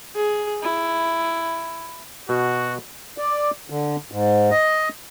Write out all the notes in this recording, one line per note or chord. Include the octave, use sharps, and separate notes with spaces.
G#4
E4
B2 F#4
D5
D3
G#2
D#5